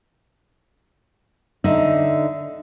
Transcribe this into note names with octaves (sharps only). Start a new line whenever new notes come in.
D3 D#4 E5